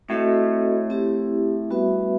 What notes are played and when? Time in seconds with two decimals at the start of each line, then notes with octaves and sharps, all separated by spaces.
0.09 A2 C4 F#4 A4 D#5
0.90 C4 E4 G4
1.70 G3 B3 F#4 B4 E5